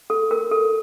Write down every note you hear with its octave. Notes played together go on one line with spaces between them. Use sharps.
A4
A#4
A4